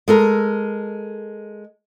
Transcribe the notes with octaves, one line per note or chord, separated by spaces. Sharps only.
G#3 A4 A#4